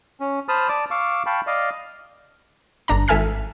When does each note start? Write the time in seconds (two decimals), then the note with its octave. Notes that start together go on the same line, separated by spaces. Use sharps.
0.20 C#4
0.48 C5 A5 B5 D#6 F6
0.69 D5 A5 D6
0.91 F5 C#6 D6 E6
1.26 F5 G5 A5 B5 C#6
1.47 D5 D#5 F5
2.88 G1 D4 A#5
3.08 G#1 A4 E5 G#5 F6 B6